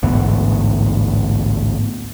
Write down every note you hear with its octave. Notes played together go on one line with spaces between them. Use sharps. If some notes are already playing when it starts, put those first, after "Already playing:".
A1 D2 G#2 B3